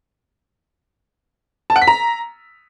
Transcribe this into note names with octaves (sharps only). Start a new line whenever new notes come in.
A5
F#5
B6
A#5